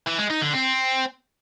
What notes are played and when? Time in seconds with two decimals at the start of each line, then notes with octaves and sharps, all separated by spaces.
0.07 E3
0.18 G#3
0.30 D#4
0.42 D3
0.53 C4